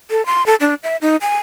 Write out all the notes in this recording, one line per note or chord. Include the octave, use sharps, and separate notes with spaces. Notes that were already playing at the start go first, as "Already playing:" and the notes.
A4
C6
A4
D4
E5
D#4
G#5